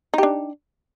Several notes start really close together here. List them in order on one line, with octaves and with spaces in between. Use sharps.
D#4 G4 D4